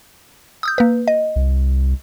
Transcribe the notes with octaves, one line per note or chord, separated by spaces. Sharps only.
D#6 E6 G6
A#3 B4
D#5
C2